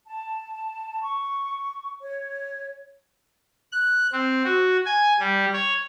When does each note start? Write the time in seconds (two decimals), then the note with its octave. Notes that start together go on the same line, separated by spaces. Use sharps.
0.07 A5
1.03 C#6
2.01 C#5
3.72 F#6
4.12 C4
4.44 F#4
4.85 G#5
5.19 G3
5.53 C#5